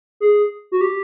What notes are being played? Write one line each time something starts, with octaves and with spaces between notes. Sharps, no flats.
G#4
F#4
G4